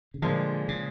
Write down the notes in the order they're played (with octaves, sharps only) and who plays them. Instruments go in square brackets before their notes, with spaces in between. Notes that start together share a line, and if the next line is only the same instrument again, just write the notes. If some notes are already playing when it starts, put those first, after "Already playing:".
[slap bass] C#3
[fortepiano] A#2 F3 G#3 [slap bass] D3
[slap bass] C#3